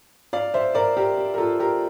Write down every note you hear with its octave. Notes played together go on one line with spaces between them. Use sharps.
D5 F5
C5 E5
A#4 D5
G4 A#4
G4
A#4
F4 A4
G4 A#4